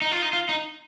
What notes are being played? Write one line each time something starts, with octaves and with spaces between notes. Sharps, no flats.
D#4
F4
D#4
F4
D#4